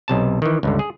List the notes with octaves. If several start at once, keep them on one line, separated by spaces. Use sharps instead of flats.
B1 C3 A5
D#3 E3
C#2 G2 D3
G#4